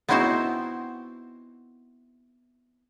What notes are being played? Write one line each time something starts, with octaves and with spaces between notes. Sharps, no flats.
B3 C4 D#4 E4 F#4 C5